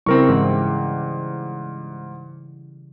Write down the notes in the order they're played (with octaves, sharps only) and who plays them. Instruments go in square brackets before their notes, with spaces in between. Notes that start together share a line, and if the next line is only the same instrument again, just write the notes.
[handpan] C#3 G3 E4 [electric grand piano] C4 A#4 C#6
[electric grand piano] G#2 [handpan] E3